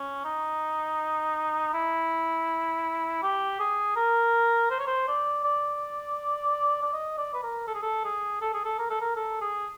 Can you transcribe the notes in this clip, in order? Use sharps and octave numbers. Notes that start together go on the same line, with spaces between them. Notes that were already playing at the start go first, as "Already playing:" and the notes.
Already playing: C#4
D#4
E4
G4
G#4
A#4
C5
C#5
C5
D5
D5
D5
D#5
D5
B4
A#4
A4
G#4
A4
G#4
A4
G#4
A4
A#4
A4
A#4
A4
G#4